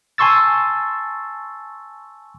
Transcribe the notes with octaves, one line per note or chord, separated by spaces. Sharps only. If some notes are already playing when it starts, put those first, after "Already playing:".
G#5 A5 C6 C#6 E6 A6